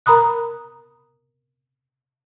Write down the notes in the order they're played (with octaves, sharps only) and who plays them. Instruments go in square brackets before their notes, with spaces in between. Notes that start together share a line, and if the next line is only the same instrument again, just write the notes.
[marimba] A#4 A#5 B5 D#6 F#6